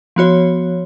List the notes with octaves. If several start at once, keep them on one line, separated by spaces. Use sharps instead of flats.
F3 B3 F#4 C#5